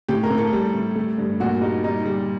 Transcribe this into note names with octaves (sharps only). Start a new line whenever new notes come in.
A2 G4
A#4
A2
A4
G3
A2
A3
G2
A#2 F#4
G3 D#4
G3 D#4
G3